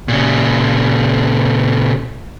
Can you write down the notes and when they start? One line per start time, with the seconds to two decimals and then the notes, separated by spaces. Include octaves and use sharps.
0.08 A#2 C#3